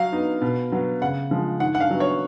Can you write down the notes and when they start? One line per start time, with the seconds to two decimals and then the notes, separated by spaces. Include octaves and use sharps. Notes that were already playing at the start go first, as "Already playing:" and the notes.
Already playing: F#3 F5
0.12 B3 D#4
0.42 B2
0.72 F#3 B3
1.01 C#3 F#5
1.31 F3 G#3
1.60 D#3 F#5
1.75 F#5
1.80 F5
1.91 F#3 B3
2.00 C#5